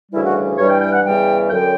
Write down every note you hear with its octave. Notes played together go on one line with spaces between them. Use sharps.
D2 C#3 E3 G3 E4
F#4
G2 E3 G3 C#5
G5
G5
F#5
E2 C#3 E3 G3 G5
F#2 D3 F#3 G5